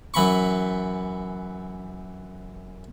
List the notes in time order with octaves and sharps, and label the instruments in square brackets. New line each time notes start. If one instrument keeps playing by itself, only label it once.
[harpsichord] F#2 E3 B5 C#6